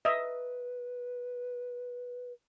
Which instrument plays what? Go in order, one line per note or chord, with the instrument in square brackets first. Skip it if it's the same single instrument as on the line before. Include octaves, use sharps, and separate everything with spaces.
[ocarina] B4 [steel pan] D#5 E5